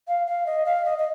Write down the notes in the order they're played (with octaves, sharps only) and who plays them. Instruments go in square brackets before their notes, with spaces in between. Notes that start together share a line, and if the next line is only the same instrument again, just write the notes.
[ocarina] F5
F5
D#5
F5
D#5
D#5